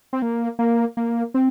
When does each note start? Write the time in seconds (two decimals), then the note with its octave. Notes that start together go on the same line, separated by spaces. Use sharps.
0.13 C4
0.22 A#3
0.59 A#3
0.97 A#3
1.34 C4